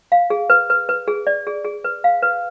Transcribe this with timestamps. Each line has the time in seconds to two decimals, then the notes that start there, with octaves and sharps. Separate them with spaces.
0.12 F5
0.30 G#4
0.50 B4
0.70 B4
0.89 B4
1.08 G#4
1.27 D5
1.47 G#4
1.65 G#4
1.84 B4
2.04 F5
2.22 B4